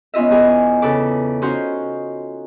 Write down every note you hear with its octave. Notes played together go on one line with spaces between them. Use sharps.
B3 C#4 F4 D#5 E5
E2 F4 G#4 G#5
C#3 A4 B4 D6
C#4 D#4 F4 F#4 C5